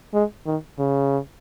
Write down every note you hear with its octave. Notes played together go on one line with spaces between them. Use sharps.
G#3
D#3
C#3